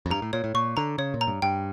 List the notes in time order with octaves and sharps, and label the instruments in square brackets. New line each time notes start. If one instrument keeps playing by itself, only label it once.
[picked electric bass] F2
[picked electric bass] G2 [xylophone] A#5
[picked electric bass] A2
[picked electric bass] A#2 [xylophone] C#5
[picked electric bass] A2
[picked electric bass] A#2 [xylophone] C#6
[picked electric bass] D3 [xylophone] A#5
[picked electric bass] C#3 [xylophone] C#5
[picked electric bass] A#2
[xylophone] A#5
[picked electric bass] G2
[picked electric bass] G2 [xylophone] G5